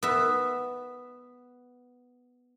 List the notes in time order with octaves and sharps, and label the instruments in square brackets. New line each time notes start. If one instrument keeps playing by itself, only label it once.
[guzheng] B3 E5